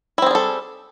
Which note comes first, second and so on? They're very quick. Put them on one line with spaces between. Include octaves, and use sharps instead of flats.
E4 C4 G#4 G3 A4